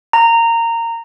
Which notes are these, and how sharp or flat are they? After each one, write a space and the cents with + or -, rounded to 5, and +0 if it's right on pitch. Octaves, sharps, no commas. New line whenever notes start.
A#5 -15